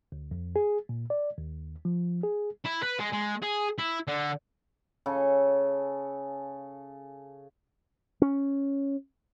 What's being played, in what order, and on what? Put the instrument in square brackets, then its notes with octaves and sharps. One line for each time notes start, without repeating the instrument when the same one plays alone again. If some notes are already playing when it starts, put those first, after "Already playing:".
[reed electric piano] D2
F2
G#4
A#2
D5
D#2
F3
G#4
[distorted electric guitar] E4
B4
G#3
G#3
G#4
E4
D3
[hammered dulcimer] C#3 G#4 A4
[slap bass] C#4